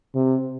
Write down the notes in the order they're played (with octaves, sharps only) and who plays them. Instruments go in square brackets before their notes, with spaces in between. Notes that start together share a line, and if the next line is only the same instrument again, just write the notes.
[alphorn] C3